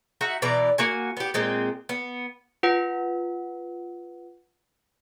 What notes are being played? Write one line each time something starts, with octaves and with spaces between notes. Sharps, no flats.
D#4 F#4 E5 F#5
B2 E3 D5 A#5
A#3 F#4 G#5
B3 G4
A#2 G#3 C4
B3
F4 B4 F#5